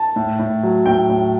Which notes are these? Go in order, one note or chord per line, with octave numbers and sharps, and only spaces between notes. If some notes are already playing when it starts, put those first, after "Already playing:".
Already playing: A5
A2
A2
F#3
A2 G5
A2